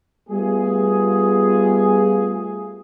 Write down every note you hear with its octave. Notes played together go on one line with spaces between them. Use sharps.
G3 A3 B3 F4 G#4